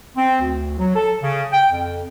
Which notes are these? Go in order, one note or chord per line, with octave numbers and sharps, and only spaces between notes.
C4
D2
F#3
A4
C#3
G5
F2